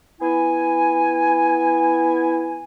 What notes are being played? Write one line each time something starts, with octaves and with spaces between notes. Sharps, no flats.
B3 E4 G#5